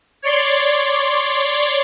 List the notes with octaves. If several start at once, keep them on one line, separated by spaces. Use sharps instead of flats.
C#5 D5 C6